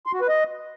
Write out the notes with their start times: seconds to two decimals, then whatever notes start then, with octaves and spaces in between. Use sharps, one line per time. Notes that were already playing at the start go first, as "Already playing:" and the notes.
0.06 C6
0.14 F#4
0.21 B4
0.28 D#5